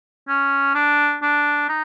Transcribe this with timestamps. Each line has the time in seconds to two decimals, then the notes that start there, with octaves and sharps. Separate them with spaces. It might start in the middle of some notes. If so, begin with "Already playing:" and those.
0.28 C#4
0.75 D4
1.22 D4
1.69 D#4